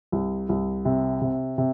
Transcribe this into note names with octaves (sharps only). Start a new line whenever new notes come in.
C2
C2
C3
C3
C3